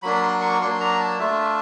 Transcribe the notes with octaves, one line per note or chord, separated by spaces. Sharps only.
F#3 A#3 D4 B5
C6
C#6
F#3 A#3 D4 C6
A#5
A5
A3 D4 F4 E5